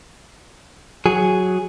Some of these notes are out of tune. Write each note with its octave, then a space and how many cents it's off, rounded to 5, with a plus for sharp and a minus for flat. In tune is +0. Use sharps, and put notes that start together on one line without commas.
F#3 +0 G#4 +0